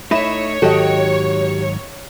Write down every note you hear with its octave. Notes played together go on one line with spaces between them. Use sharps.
A3 D#4 E4 C#5 E5 B5 E7
G#2 D#3 F#3 F#4 G4 A4 D#5 G5